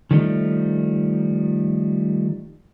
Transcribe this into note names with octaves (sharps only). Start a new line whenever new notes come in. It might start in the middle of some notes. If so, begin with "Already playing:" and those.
D#3 F3 G3 A3 C#4 D#4